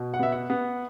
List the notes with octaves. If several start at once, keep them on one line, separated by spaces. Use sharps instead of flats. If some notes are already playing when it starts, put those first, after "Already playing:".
Already playing: B2
F#5
B3 E5
F#5
B3